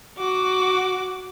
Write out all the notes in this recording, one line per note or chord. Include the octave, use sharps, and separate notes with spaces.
F#4 D6